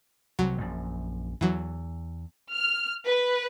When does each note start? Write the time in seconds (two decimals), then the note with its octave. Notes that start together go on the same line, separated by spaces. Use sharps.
0.39 C2 C3 F#3
0.58 A#1 F#2
1.41 E2 E3 F#3
2.52 F6
3.06 B4